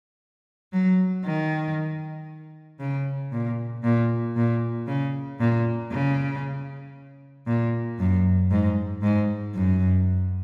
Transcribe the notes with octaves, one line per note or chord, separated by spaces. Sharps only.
F#3
D#3
C#3
A#2
A#2
A#2
C#3
A#2
C#3
A#2
F#2
G#2
G#2
F#2